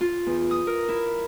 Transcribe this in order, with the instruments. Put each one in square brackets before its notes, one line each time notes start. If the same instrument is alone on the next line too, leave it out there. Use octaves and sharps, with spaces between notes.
[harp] F4
E2
D#6
A#4
E4